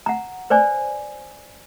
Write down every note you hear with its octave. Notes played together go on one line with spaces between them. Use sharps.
F#5 A#5
B4 C5 D5 G#5